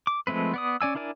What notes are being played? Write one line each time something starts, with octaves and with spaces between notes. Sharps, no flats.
D6
F3 G#3 A3 C4 B4
B3 D5 D#6
C#4 D5 G#5 E6
D4 E4 A#4 D5 G#5